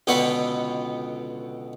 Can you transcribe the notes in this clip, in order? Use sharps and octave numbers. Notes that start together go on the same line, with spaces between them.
C#2 B2 D3 B3 B4 C#6